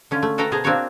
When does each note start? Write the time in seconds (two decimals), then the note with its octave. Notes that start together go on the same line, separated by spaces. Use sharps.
0.11 D3 C#4 F4
0.23 A3
0.38 F#4 A4 B4 F5 G5 A#5
0.52 B2 G#4 C5 A5 A#5
0.64 A#3 C4 D4 F#4 C#5 F5